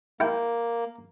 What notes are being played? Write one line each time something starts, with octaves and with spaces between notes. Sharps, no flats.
A#3 E4 G5